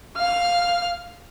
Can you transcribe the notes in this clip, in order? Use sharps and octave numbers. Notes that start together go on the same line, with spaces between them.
F5 F6